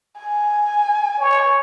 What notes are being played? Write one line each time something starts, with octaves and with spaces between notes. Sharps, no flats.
G#5
C#5